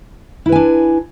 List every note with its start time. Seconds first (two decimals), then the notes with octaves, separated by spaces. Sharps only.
0.46 E4
0.49 B4
0.52 G#5
0.56 D4